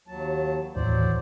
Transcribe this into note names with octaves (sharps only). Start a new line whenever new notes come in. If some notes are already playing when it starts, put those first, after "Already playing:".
D#2 F#3 A5
D#2 A2 E3 F#3 C5 D5